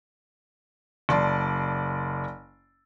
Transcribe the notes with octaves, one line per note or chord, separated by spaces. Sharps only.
F#1 D5 A5 C6